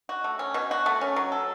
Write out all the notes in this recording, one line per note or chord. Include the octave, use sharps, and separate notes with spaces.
F#4
A3
C#4
B2
F#4
A3
C#4
F#3
A4